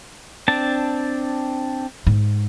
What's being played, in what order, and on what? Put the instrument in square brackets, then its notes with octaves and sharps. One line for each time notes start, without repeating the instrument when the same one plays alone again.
[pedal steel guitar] C4 D4 A5
[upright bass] G#2